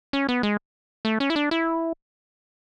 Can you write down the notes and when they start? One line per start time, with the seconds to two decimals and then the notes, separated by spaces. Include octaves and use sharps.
0.13 C#4
0.29 B3
0.43 G#3
1.05 A3
1.20 C#4
1.30 E4
1.36 D4
1.51 E4